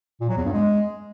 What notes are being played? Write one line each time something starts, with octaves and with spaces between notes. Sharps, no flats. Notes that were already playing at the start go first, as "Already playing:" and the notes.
A#2
F#3
E2
G2
G#3